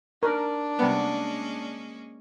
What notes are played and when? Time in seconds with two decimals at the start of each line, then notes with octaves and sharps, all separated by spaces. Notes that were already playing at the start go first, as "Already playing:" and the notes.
0.23 D4 A#4
0.79 C3 G3 G#3 A#3 B3 C#4